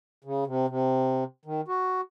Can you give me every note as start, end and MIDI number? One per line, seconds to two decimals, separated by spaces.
0.24 0.44 49
0.47 0.66 48
0.69 1.24 48
1.45 1.61 51
1.68 2.01 66